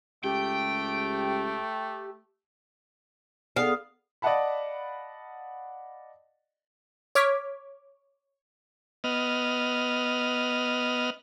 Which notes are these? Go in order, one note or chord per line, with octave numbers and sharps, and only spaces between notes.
C#2 A3 G4 G5
B3 G#4 A4 D5 F5 D#6
D5 D#5 F5 F#5 A5 B5
C#5 D6 F6 G#6 B6
B3 D#5 F6